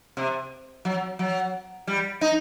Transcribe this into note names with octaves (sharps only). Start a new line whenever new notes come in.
C3
F#3
F#3
G3
D#4